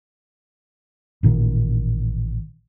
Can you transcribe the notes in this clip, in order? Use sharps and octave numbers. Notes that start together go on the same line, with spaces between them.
A1 A#2 D#3